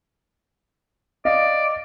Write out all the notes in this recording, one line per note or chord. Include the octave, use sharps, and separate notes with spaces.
D5 D#5 F5